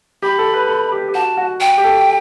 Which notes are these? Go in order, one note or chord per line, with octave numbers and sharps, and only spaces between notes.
G4 B5
A4
B4
A4
G4
G4
F#4 A5
F#4
G5
G4
A4